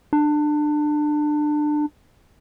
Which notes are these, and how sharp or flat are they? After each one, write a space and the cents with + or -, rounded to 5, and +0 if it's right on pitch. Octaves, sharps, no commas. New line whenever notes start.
D4 +25